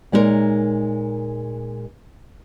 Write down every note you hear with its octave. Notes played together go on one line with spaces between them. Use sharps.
A#2 G#3 D#4 G#4 A#4 C#5